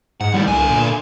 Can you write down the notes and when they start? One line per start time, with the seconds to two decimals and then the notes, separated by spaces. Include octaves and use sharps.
0.21 G#2 F#5
0.34 A2 D#3 G3
0.48 C2 D3 G#5
0.70 A#2